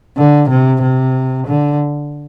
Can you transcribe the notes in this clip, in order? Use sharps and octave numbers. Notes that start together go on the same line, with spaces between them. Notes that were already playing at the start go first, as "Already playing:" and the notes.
D3
C3
C3
D3